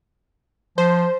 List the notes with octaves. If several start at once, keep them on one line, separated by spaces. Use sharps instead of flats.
F3 C5